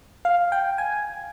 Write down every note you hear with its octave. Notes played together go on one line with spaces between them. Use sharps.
F5
G5
G#5